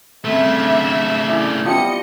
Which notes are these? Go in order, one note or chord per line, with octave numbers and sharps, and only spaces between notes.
C#3 G3 A3 C4 A4 E5
F#3 D4
E4 D5 G#5
F3 G3 B3 D#5 E5 A5 C#7